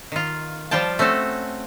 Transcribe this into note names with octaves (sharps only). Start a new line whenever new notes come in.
D#3 F4
F3 G3 F4 G5 A5
A3 C4 C#4 F#4 A4